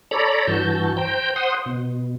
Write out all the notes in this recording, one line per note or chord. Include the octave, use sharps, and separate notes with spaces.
A4 C#5 D5 A#5 B5
G2 E3 F#4 A5 G6
C5 G5 A#5 G6
C5 F#5 C6 D#6
B2